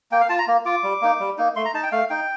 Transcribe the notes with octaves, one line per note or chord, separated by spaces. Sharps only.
A#3 G5
F5
F4 A5
A#5
A#3
F4 D6
G3
A#3 D#4
G3
A#3 D#4
A3 C6
A#5
D#4 A5
G5
A3 F5
D#4 G5